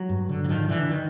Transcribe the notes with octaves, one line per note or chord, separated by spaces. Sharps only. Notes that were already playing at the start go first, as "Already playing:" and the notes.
Already playing: F#3
G2
D3
F#3
G#2 D#3 F3
D3 E3
D#3